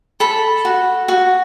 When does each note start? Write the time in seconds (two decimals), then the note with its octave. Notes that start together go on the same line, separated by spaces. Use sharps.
0.20 A4 B5
0.65 F#4
1.08 F#4